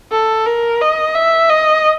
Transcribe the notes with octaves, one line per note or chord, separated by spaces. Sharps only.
A4
A#4
D#5
E5
D#5